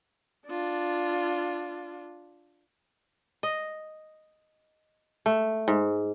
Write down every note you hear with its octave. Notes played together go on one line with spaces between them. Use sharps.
D4 F4
D#5
A3
G#2